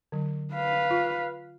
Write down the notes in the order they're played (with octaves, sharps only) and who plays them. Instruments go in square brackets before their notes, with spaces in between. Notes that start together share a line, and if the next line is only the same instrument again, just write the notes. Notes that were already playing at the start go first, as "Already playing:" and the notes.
[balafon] D3 F#3
[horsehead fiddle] B4 F5
[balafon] F4